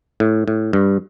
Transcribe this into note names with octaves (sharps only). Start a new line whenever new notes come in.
A2
A2
G2